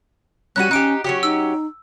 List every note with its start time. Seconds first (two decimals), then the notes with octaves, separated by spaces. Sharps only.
0.56 G3 C#4 D#4 F#4 F#6 D#7
0.71 C#4 D#4 G4 F#6 D7
1.04 F#3 C#4 F#4 G4
1.23 D#4 E6